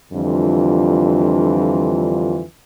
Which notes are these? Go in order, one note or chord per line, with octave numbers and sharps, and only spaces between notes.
F2 D3 E3 G3 D4 F4